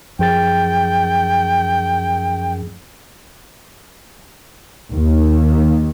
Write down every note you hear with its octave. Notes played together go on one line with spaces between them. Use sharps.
F#2 F3 G#4 G5 A6
D#2